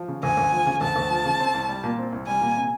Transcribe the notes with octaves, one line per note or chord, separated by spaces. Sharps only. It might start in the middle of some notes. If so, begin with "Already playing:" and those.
Already playing: F3
C#3
D2 G#5
D2
F3
C#3
D2 A5
D2
F3
C#3
C4
C2
G3
A#2
C4
C2
G3 G#5
A#2
C3